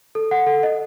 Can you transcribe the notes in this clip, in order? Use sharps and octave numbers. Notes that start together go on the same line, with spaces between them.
A4
F#5
A4
D#5